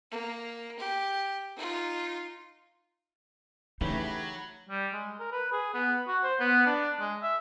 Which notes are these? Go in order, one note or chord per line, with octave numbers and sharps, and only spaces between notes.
A#3
G4
D#4 F4
C#3 E3 F#3 A3 D#4 G4 C#5 B5
G3
G#3
A#4
B4
G#4
B3
F#4
C5
B3
D4
G#3
E5